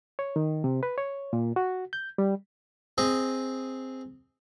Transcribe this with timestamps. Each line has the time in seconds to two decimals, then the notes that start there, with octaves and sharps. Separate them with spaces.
0.19 C#5
0.36 D#3
0.64 C3
0.83 B4
0.98 C#5
1.33 A#2
1.56 F#4
1.93 G6
2.18 G3
2.98 C4 G#4 D#5